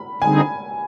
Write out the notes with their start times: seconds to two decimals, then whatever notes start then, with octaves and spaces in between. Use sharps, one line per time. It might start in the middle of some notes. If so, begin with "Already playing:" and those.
Already playing: B5
0.22 D3 G3 C4 D#4 G#4 G#5